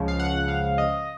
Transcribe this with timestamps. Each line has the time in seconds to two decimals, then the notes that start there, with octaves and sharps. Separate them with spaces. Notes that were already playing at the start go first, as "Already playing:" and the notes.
Already playing: C#2 C#3 F3
0.08 F5
0.20 F#5
0.48 F5
0.78 D#5